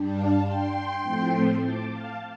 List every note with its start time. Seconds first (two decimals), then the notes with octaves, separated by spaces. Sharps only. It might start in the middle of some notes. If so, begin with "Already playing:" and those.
Already playing: G2 G3 D4
0.14 F5 A5
0.43 G5 C6
1.03 A2 F3 A3 C4
1.62 A5 D6
1.92 F5 A5